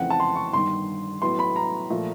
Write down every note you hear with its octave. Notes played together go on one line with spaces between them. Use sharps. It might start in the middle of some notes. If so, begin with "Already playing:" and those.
Already playing: F2 C#3 E3 A3 C4 F#5
A5
C6
C#6
G1 G2 D#3 C6
A2 F#3 B3 E4 C6
B5
A#5
A#2 F3 A3